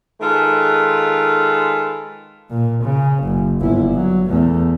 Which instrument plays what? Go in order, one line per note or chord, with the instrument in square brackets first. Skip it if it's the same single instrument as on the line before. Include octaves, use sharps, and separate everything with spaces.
[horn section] D#3 G#3 F4 A4 B4
[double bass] A#2
C#3
F#1
G1 E4
F#3
E2 A3